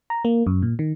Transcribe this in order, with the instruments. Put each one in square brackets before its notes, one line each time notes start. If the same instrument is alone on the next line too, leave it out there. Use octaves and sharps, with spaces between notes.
[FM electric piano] A#5
A#3
F#2
A#2
D#3